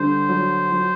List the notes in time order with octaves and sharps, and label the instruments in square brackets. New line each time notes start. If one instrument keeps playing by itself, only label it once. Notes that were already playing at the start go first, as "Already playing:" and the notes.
Already playing: [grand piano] D3 G3 [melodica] C5
[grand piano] F#3
F#3